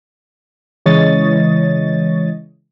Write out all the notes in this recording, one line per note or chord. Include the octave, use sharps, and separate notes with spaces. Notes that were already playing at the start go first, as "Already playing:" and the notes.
C#3 E3 G#3 C#5 D#5 A6